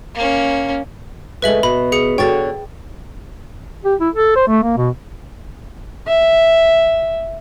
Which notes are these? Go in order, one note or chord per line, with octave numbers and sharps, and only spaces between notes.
A#3 C#4
C#3 G#3 A3 B4 E5 F#7
B2 B5
G#4 C#7
D3 F#4 C#5 G5 A6
G4
E4
A4
C5
A3
A#3
B2
E5